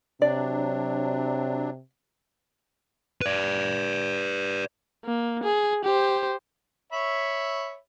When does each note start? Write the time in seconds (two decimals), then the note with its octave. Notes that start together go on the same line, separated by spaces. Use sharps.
0.22 C3 F#3 D4 D5
3.22 B4 D5
5.05 A#3
5.44 G#4
5.85 G4 C5
6.92 C#5 E5 B5